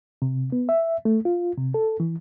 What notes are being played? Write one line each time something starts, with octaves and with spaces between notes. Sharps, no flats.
C3
B3
E5
A3
F4
C3
A4
E3